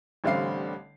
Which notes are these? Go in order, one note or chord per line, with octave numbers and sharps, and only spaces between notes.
A1 D3 G3 C4 F5 C7